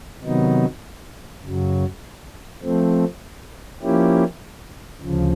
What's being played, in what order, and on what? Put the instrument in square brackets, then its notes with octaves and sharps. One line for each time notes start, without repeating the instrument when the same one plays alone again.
[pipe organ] C3 D#3 F#3 B3 D#4
F#2 C#3 F#3
F3 A3 C4
F3 A#3 C#4 E4 G4
D2 C#3 F3